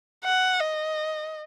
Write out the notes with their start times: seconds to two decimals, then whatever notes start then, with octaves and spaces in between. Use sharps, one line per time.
0.25 F#5
0.60 D#5